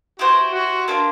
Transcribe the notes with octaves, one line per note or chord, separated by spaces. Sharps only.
E4 F#4 G4 C5
F#4
A#3 D4 F4